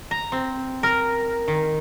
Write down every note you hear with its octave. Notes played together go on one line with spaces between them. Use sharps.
A#5
C4
A#4
D#3